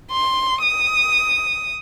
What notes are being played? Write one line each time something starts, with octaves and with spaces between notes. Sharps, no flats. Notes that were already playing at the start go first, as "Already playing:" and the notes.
C6
D#6